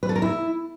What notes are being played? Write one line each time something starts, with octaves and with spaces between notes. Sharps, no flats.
B4
A4
A#4
E4